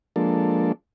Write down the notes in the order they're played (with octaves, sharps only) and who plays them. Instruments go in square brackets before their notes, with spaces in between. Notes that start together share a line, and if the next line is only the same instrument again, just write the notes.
[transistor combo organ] F3 G#3 A#3 D4 A4